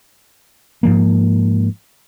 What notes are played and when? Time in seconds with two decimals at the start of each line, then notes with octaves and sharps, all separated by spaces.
0.83 G#2 F3 A#3